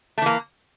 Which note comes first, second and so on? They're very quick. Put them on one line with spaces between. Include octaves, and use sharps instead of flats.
A3 E3 A#3